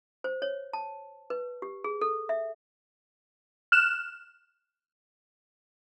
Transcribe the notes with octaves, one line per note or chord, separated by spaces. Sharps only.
C5
C#5
A5
B4
G4
G#4
A4
E5
F6 F#6 E7